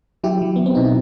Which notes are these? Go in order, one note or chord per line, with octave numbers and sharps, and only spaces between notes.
F#3 E4 G4
F#3
F#3 B3
C4
B2 D#4
E4